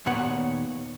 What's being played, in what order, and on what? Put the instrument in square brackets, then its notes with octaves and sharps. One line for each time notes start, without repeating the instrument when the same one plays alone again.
[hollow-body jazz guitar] D#2 A#2 B3 C#5 F#5